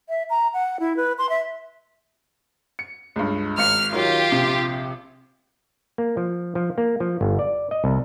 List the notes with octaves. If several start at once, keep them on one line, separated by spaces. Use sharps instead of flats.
E5
A#5
F#5
E4
B4
C6
E5
C#7
C#2 G2
G#1 F5 F6 C#7
D#3 F#3 F4 G4
A#1 C3 D6
A#3
F3
F3
A#3
F3
G1
D5
D#5
C2